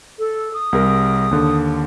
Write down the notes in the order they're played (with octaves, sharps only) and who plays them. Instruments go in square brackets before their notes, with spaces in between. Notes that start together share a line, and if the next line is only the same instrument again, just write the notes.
[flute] A4
D#6
[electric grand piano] C2 G#4 A#4
D#2 D3